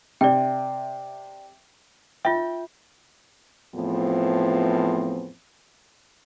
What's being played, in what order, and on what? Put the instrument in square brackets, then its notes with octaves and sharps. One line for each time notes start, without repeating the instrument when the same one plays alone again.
[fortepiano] C3 [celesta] D5 E5 G5
[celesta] F4 E5 [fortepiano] G5
[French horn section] E2 A2 F3 B3 C4 F4